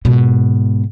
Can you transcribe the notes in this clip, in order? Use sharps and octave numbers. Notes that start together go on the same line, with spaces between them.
G#2 B2